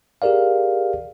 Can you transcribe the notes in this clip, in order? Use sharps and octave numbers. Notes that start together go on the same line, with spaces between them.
G4 G#4 A#4 D5 F5